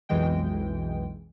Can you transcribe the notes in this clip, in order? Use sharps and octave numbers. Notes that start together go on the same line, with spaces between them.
B1 F2 B2 E3 G#3 G5